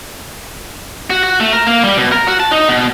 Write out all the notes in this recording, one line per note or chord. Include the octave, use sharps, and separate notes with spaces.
F#4
F#4
A3
A#4
A#3
G3
B2
A#4
F#4
A5
D#4
B2